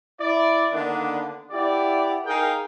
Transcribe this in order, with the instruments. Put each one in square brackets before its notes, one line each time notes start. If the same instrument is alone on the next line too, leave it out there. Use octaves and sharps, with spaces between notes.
[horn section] E4 D5
D3 D#3 A#3 B3 D4
B3 E4 G4 D5
D#4 G#4 A#4 F5 G5